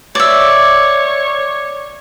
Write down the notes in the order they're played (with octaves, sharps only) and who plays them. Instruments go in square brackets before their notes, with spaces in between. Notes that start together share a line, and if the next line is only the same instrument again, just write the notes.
[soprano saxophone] C#5 [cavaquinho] D5 E5